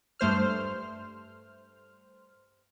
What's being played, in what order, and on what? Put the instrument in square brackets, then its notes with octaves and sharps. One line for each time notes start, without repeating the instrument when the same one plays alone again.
[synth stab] G2 A3 C5 F6